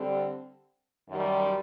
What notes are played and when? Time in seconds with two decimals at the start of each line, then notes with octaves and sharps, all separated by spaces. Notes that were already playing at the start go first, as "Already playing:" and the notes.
Already playing: D3 G3 C4
1.09 F#2 D#3 G3